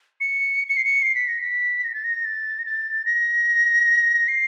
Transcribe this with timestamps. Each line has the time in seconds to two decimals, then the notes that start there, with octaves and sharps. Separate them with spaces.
0.20 C#7
0.69 C#7
0.77 C7
0.85 C#7
1.02 C7
1.15 B6
1.28 A#6
1.41 B6
1.84 A#6
1.94 A6
2.04 A#6
2.25 A6
2.59 A#6
2.65 A6
3.06 A#6
4.28 C7